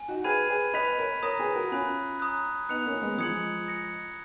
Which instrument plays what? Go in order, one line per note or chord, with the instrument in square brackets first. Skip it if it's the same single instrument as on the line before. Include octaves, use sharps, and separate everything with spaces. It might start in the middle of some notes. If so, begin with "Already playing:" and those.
Already playing: [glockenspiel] G#5
[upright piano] D#4 F#4
[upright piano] G#4 B4 [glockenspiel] B5 F6 G#6 D#7
[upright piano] G#4 B4
[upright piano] B4 D#5 [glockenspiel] B5 F#6 B6 F7
[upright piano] A#4 C#5
[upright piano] A#4 C#5 [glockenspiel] A#5 D#6 A#6
[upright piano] G#4 B4
F#4 A#4
[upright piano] C#4 F4 [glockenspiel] G#5 B5 F#6
[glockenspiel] A#5 D#6 F#6
[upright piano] B3 D#4 [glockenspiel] F#6 C#7 F7
[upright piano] A#3 C#4
G#3 B3
[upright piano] F3 G#3 [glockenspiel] D#6 G#6 C#7 F#7
[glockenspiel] D#6 A#6 C#7